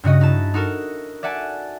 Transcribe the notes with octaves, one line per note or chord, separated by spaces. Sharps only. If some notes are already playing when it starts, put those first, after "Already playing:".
G2 C#3 F#4 D#5
D#4 E4 A5
D#4 F#4 A4 A#4
D5 E5 F#5 G#5 A5